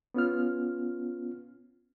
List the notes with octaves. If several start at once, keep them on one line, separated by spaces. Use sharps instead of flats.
B3 C#4 F4 F6